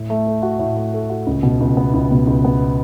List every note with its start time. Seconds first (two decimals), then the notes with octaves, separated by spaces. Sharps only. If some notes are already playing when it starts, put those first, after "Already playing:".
Already playing: A2
0.10 A3
0.27 A4
0.43 F#4
0.59 A2
0.77 A3
0.93 A4
1.10 F#4
1.27 C#2
1.43 B2
1.61 C#2
1.77 B3
1.94 C#2
2.11 B2
2.27 C#2
2.45 B3